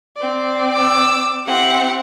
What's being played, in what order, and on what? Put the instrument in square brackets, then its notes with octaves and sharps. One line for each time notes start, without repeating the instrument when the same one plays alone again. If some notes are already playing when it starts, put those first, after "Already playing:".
[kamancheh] C4 D5
[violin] D6 E6
[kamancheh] C4 G4 [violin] E4 F#5